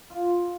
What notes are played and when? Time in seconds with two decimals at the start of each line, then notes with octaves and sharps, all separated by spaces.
0.10 F4